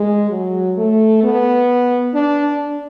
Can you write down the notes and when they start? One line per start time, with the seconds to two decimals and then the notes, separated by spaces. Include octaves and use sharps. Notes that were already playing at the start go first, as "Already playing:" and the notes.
Already playing: G#3
0.30 F#3
0.77 A3
1.24 B3
2.15 D4